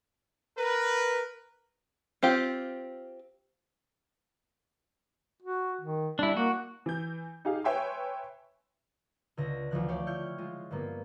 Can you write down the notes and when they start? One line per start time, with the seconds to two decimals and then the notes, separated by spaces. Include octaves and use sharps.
0.57 A#4 B4
2.23 C4 F4 G4
5.43 F#4
5.81 D#3
6.19 G3 D4 E4
6.37 A#3 F#4
6.86 E3 G6
7.45 D#4 G4 G#4 F5
7.64 B4 C#5 E5 G5 G#5 C6
9.37 C#2 D3 A#6
9.71 D2 E3 F3 F#6
9.88 A3 C#5 D5 F5 G5
10.07 E4 C#6 F6 G6
10.38 G#3 F4
10.71 G2 D3 A#3 B3